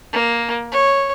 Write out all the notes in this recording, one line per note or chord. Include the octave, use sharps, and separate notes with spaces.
A#3
C#5